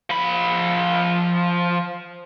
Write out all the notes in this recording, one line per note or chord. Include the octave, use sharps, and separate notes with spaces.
F3 B5